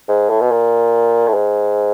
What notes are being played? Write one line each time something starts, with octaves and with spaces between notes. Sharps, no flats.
G#2
A2
B2
A#2
A2
G#2